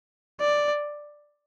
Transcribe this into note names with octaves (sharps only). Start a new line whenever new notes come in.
D5